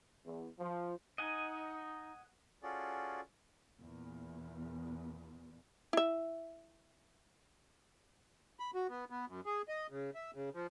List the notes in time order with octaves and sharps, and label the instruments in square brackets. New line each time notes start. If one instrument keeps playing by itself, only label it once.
[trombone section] E2
F3
[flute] D#4 [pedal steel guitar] D#5 F#5 G#5
[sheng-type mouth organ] C#4 F4 F#4 G#4 A4 D5
[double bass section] E2 A#2
[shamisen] E4 E5
[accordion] B5
F#4
B3
B3
F#2
G#4
D#5
C#3
E5
C#3
F3